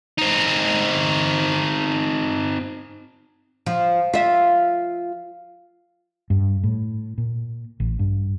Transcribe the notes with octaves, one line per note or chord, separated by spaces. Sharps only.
C4 D#4
F3
F4 E5
G2
A2
A#2
A1
G2